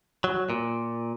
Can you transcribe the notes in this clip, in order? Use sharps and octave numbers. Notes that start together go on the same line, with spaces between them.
F#3
A#2